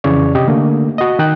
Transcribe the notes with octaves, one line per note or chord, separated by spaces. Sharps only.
F2 C#3 E3 C#5 D5
C3 G4 D#5
D3 A3 A#3
F#4 D#5
D#3 D#4 G5 F#6